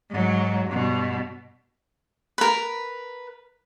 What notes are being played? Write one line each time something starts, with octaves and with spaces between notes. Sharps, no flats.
G#2 F#3
G2 B2
A#4 B4